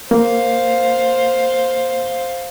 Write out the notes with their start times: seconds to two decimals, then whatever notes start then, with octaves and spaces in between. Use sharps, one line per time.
0.11 A#3 C5 F5